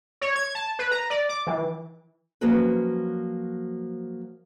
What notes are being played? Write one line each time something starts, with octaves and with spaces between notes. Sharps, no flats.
C#5
G#6
A5
B4
A#5
D5
D6
E3
F3 F#3 A#3 C#4 F#4 B4